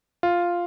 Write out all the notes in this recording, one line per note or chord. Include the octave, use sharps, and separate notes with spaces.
F4